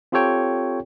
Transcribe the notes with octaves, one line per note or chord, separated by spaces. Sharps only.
C4 F4 G4 A4 C#5 G5